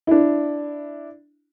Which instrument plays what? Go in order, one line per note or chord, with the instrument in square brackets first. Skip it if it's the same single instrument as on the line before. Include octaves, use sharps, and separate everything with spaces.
[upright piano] D4 E4